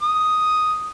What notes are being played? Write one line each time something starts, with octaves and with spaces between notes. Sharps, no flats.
D#6